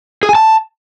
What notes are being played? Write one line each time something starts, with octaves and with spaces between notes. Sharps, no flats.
G#4
G#5
A5